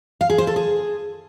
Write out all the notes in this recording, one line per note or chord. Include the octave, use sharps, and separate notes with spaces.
F5
G#4
C5
A4
G#4